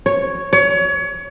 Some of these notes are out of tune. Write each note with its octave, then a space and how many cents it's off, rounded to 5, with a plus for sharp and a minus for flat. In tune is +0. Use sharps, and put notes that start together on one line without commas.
C#5 +0
C#5 +30